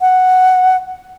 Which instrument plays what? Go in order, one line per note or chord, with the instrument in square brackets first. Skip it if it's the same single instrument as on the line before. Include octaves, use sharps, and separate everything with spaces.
[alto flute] F#5